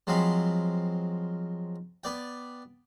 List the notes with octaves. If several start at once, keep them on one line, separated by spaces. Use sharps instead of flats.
F3 F#3 G#3 C4 F5 B5
B3 D5 G5